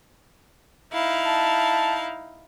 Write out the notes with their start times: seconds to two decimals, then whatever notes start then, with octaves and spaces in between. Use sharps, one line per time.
0.92 D#4 E4 F5
1.26 A5